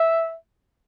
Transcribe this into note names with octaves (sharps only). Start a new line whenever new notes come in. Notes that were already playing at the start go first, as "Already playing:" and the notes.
Already playing: E5